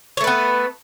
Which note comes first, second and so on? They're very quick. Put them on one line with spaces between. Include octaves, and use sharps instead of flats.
C#5 A3 B4 B3